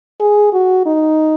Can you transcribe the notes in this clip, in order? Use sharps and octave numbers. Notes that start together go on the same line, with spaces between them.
G#4
F#4
D#4